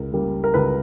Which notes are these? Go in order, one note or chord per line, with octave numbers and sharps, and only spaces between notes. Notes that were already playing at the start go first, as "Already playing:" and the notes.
Already playing: C#2 A#4
C#3 G3 A#3
A#4
C#2 B4